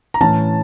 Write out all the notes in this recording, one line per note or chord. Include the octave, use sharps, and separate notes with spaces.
A#5
A2 E3 A3 C#4 A5